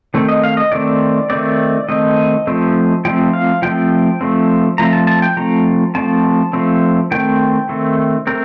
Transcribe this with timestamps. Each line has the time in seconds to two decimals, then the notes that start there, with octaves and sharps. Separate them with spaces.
0.14 D#3 A3 C4
0.29 D#5
0.44 F5
0.57 D#5
0.72 D#3 A3 C4 D5
1.30 D#3 A3 C4 D5
1.88 D#3 A3 C4 D#5
2.47 F3 A3 C4
3.05 F3 A3 C4 G5
3.33 F5
3.62 F3 A3 C4 G5
4.21 F3 A3 C4
4.78 F3 A3 C4 A#5
4.93 A5
5.07 A5
5.22 G5
5.37 F3 A3 C4 A#5
5.95 F3 A3 C4 A5
6.53 F3 A3 C4
7.11 D#3 A3 C4 G5
7.69 D#3 A3 C4
8.27 A3 C4 A#4